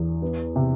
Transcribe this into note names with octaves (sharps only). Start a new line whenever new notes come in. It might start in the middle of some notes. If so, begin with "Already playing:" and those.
Already playing: E2
B3
C3